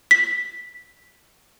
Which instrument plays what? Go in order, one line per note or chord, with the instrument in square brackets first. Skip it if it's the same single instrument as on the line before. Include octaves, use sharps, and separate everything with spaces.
[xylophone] B6